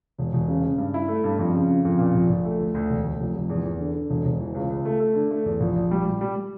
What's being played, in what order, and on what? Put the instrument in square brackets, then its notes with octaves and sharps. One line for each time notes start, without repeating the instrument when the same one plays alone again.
[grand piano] E1
E1
C#3
C#3
G2
E4
A3
G2
F2
C#3
C#3
F2
A#2
A#1
A#1
A3
D2
D2
E1
D2
F1
F1
E2
E2
D3
D3
E1
E1
E3
C#2
C#2
A3
A3
D3
A3
E2
A#1
A#1
G3
G3
G3
G3